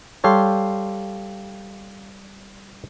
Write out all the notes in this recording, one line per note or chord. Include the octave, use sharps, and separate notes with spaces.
G3 G4 A4 C#5 F5 C6